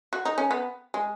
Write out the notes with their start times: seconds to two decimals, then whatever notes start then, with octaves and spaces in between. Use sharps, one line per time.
0.13 F#4
0.25 D#4
0.38 C#4
0.51 B3
0.94 G#3